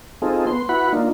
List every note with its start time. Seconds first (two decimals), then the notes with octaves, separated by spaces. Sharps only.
0.22 C4 D#4 F4 G#4 A4
0.47 B3 C6
0.69 E4 F#4 B4 F#5 B5
0.93 A#3 D4 D#4 F4